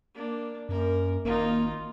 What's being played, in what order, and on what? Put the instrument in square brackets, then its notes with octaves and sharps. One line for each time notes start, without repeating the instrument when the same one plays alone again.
[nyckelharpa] A#3 D4
[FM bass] F#2 [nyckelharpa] A#3 A#4
[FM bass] G#1 [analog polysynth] A#3 [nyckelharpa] D#4 F4